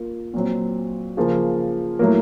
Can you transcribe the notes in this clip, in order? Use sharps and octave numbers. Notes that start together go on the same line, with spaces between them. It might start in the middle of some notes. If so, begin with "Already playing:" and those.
Already playing: A#3 F4 A#4
A#2 F#3 C4
C#3 F3 A#3
A2 F#3 A#3